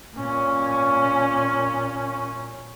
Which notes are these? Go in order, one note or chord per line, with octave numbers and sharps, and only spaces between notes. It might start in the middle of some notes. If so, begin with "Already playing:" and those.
A#2 C#4